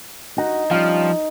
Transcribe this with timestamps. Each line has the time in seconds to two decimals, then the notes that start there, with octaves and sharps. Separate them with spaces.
0.38 D#4 F#4
0.71 F3 G3 C#4 F5